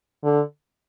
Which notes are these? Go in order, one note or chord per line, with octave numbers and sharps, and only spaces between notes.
D3